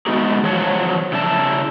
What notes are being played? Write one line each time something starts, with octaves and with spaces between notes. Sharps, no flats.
G#3 A3 B3 D#4 F#4 G#4
E2 F3 F#3 C#5 F#5 A5
C#3 E4 D5 A5